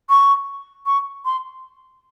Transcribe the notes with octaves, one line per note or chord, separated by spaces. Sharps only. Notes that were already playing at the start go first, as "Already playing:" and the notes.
C#6
C#6
C6